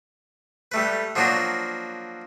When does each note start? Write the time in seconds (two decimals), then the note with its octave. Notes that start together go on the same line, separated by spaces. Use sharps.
0.72 G3 A3 B4
1.16 F3 F#3 A#3 D4 F#4